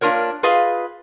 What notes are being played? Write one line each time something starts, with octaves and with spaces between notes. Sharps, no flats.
A#3 D4 F4 A#4 C#5
F4 G#4 B4 D#5 F5